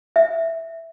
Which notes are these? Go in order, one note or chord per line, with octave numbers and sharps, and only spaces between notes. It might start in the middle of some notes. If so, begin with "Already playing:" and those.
E5